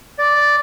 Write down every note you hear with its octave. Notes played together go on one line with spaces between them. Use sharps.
D5